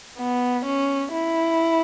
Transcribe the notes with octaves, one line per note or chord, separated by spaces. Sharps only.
B3
C#4
E4